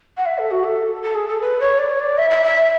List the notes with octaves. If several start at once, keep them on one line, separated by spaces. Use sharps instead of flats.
F#5
E5
A4
F#4
A4
A4
G#4
A4
B4
C#5
D5
C#5
D5
E5
E5
E5